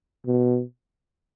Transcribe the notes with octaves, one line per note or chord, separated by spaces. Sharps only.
B2